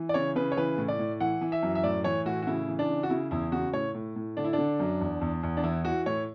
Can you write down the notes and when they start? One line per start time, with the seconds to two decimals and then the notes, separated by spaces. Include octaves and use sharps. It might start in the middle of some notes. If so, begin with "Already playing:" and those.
Already playing: E3
0.09 D5
0.14 C#3 C#5
0.36 C#3 B4
0.52 C#5
0.57 E3 B4
0.78 A2
0.88 D5
0.99 A2
1.20 E3 F#5
1.41 E3
1.52 E5
1.63 F#2
1.75 E5
1.84 A2 D5
2.04 E3 C#5
2.26 A2 F#4
2.42 F#4
2.47 C#3 E4
2.68 E3
2.79 D4
2.89 C#3
3.03 F#4
3.10 C#3 E4
3.31 E2 E4
3.52 C#3 F#4
3.73 A2 C#5
3.95 A2
4.16 A2
4.37 D3 D4
4.45 E4
4.53 D4
4.58 D3
4.80 F#2
5.01 E2
5.21 E2
5.43 E2
5.57 D4
5.64 E3 E4
5.85 E3 F#4
6.06 A2 C#5